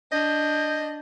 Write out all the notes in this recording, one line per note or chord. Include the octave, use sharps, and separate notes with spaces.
D4 D#5 G6